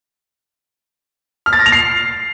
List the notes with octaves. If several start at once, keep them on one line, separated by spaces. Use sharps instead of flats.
F6
A6
A#6
F7
C7